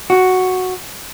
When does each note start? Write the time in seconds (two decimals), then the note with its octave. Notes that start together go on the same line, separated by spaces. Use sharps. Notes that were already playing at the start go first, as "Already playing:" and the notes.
0.10 F#4